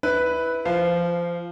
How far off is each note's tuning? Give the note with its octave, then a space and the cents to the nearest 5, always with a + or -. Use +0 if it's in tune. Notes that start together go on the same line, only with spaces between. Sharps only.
E4 -20 B4 +0
F3 -20 F5 +0